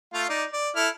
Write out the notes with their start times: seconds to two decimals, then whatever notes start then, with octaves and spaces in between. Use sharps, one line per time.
0.14 A3 F4 F5
0.29 D#4 D5
0.53 D5
0.76 E4 A4 F6